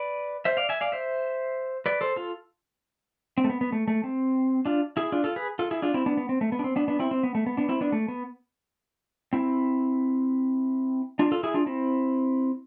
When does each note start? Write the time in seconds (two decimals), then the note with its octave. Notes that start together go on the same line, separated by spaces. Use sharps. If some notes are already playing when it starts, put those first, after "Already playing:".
Already playing: B4 D5
0.45 C5 E5
0.57 D5 F5
0.69 E5 G#5
0.81 D5 F5
0.92 C5 E5
1.86 B4 D5
2.01 A4 C5
2.16 F4 A4
3.38 C4
3.44 A3
3.50 B3
3.61 B3
3.72 A3
3.88 A3
4.04 C4
4.66 D4 F4
4.97 E4 G#4
5.12 D4 F4
5.24 F4 A4
5.36 G#4 B4
5.59 F4 A4
5.71 E4 G#4
5.82 D4 F4
5.94 C4 E4
6.06 B3 D4
6.17 B3
6.29 C4
6.41 A3
6.52 B3
6.59 D4
6.64 C4
6.76 B3 D4
6.88 B3 D4
7.00 C4 E4
7.11 C4
7.23 B3
7.35 A3
7.46 B3
7.57 B3 D4
7.69 C4 E4
7.81 B3 D4
7.92 A3
8.08 B3
9.33 C4 E4
11.19 D4 F4
11.32 F4 A4
11.43 E4 G#4
11.54 D4 F4
11.66 C4 E4